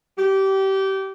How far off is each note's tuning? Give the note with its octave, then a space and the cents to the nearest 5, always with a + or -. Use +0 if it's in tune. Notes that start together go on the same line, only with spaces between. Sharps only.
G4 -25